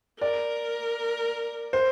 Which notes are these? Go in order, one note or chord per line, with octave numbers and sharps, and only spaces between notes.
A#4 D5
C5